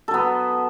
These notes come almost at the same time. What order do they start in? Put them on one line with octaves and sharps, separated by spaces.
A4 F#3 B3